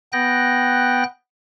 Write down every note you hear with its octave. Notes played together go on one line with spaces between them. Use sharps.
B3 G5 F#6 A#6